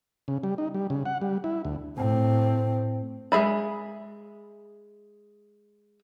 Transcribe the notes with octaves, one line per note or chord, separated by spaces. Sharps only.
C#3
G3
D#4
G3
C#3
F#5
G3
E4
D2
A2 C4
G#3 G#4 E5 B5